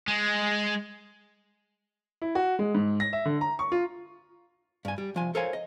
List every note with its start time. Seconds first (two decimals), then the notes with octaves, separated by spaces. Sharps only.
0.08 G#3
2.22 E4
2.35 F#4
2.59 G#3
2.75 G#2
3.00 A#6
3.13 E5
3.25 D3
3.41 A#5
3.59 C#6
3.72 F4
4.85 G2 G#5
4.98 G3
5.15 C2 F3 G#5
5.35 A4 A#4 C5 C#5 F5 G#5
5.53 D#5